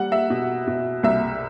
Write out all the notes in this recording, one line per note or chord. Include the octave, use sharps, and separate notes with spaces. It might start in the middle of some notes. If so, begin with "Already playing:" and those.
Already playing: G3 F#5
E5
B2
B2
C2 E5